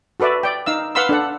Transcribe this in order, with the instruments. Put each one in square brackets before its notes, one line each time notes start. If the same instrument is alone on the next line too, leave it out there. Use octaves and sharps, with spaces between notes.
[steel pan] F#4 A4 B4 D5 E5
D5 G5
D#4 F5 E6
B4 F5 F#5 B5 C6 E6
D4 A4 F#5